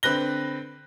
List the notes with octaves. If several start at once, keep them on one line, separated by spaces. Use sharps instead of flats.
D3 C4 B4 F#6 A#6 G7